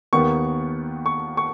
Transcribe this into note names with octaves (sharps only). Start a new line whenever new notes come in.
D#2 D#3 B3 C#6
C#6
C#6